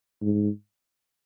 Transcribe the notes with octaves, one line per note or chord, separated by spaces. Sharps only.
G#2